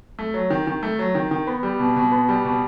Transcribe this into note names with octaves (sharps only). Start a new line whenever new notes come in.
A3
F#3
D#3
D#3
A3
F#3
D#3
D#3
B3
G3
B2
B2
B3
G3
B2